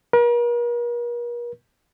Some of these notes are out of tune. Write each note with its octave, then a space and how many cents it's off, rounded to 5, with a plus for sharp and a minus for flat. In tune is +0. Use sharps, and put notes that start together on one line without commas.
A#4 +45